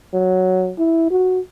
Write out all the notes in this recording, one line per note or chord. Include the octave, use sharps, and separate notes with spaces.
F#3
E4
F#4